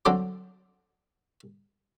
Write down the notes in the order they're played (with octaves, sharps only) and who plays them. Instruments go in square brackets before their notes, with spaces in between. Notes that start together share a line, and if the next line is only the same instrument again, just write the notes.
[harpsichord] D3 F#3 C4 A4 C5 D6